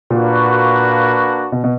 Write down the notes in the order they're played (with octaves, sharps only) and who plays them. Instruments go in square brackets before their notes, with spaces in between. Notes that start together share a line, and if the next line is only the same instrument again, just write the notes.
[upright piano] A#2 [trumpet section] A#3 D4 F#4 B4
[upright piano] B2
B2